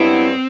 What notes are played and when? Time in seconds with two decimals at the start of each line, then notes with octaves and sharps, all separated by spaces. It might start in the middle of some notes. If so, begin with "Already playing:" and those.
Already playing: G2 F#3 B3 C4 E4